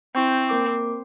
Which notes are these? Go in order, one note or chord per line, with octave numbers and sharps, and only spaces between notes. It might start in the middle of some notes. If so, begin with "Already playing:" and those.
C4 E4 C#6 G6
A#3 A#4 D6